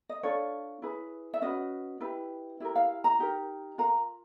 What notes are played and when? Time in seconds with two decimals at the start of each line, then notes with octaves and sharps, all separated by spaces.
0.09 D#5
0.23 D4 F4 A4 C#5
0.82 E4 G#4 B4
1.34 E5
1.41 C#4 F#4 B4 D#5
2.00 E4 G4 B4
2.60 E4 G4 A#4
2.75 F5
3.04 A#5
3.19 D#4 G4 A#4
3.78 F4 A#4 A#5